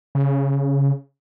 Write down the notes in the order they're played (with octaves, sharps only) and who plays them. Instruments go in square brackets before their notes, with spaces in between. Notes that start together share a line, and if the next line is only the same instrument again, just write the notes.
[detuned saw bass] C#3